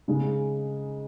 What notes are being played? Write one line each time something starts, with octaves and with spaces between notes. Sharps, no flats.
C#3 G#3 D#4 G#4